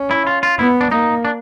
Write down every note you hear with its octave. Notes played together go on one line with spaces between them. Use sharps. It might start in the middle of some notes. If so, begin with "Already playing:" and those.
Already playing: C#4
E4
F4
F4
B3 E4
D4
A#3 D#4
D4